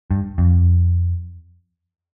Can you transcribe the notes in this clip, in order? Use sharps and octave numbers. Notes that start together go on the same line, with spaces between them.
G2
F2